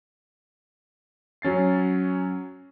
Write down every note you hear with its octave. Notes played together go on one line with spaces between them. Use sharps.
F#3 C#4 A6 C7